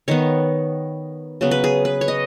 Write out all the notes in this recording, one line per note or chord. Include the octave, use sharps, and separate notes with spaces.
D#3 B3 C#5
C#3 F#3 B3
B4
G#4
B4
C#5
D#5